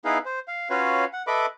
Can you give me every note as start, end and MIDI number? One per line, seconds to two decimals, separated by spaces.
0.05 0.18 59
0.05 0.18 63
0.05 0.18 64
0.05 0.18 68
0.05 0.18 71
0.05 0.18 77
0.26 0.39 72
0.48 0.69 77
0.70 1.05 61
0.70 1.05 65
0.70 1.05 66
0.70 1.05 71
0.70 1.05 73
0.70 1.05 77
1.13 1.23 78
1.27 1.46 69
1.27 1.46 71
1.27 1.46 75
1.27 1.46 76
1.27 1.46 83
1.27 1.46 86